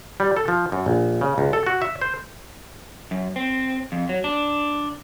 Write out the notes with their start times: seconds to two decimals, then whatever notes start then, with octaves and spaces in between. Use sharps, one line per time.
0.20 G3
0.36 A4
0.48 F3
0.72 F#2
0.86 A#1
1.21 C#3
1.38 C#2
1.53 A4
1.66 F#4
1.82 E5
2.01 C5
3.11 F#2
3.36 C4
3.92 F2
4.09 F#3
4.24 D4